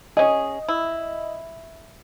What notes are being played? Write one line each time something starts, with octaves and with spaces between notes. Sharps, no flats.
C#4 G#4 D#5
E4